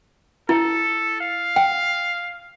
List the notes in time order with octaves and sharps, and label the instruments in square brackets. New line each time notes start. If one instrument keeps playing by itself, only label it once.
[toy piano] E4 [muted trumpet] A4
[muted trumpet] F5
[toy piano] G5